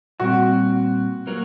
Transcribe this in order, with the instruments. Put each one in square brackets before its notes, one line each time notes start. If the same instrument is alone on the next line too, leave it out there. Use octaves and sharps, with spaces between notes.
[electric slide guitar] A#2 G3 C4 [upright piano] F#4
[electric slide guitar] F#3 A#3 F#4 A#4